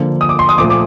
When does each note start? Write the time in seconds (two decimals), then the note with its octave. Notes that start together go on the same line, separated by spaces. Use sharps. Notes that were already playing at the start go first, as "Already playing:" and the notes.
Already playing: D3 F3 A#3
0.21 D#6
0.29 D6
0.39 C6
0.49 D#6
0.58 A#2 F3 A3 D6
0.70 D6